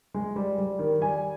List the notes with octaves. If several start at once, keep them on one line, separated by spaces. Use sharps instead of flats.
G#3
G3
G3
D#3
G3 G#5